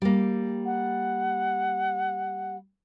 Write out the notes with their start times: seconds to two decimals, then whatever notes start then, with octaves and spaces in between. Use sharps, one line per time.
0.02 G3 A#3
0.65 F#5